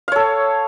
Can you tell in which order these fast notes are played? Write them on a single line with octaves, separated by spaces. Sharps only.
F5 C#5 A4